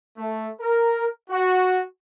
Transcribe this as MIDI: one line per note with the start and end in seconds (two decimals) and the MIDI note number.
0.17 0.49 57
0.60 1.05 70
1.30 1.80 66